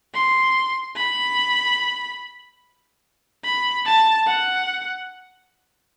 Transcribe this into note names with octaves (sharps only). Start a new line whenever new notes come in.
C6
B5
B5
A5
F#5